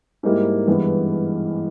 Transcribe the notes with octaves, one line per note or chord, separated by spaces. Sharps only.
G#2 G3 A#3 E4
G2 E3 G#3 B3